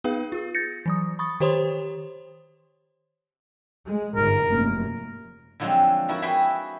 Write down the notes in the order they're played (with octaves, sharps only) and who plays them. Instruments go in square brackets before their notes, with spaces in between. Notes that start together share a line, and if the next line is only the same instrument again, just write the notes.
[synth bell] B3 D#4 G#4 B4 F5
F4 G#4
G6 A6 A#6 C#7
E3 F#3 D#6
B5 C#6 D#6 A6
D#3 G4 C5 C#5 C6 D#6
[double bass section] G#3
[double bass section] G1 G#2 [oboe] A#4
[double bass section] F1 F#2 A#3
[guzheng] D3 F3 F#3 G#3 C4
F3 E4 F#4 A#4
F#4 G#4 B4 E5 G5 C6